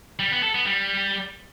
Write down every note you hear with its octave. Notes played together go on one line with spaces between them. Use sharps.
G3
B3
A4
B3
G3